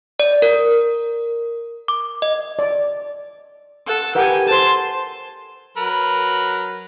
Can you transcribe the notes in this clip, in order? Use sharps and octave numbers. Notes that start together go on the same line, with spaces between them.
D5
A#4
D6
D#5
D5
A4 F#5
G4 A#4 B4 F#5 G#5
A4 C5 A5 C6
F#3 A#4 B4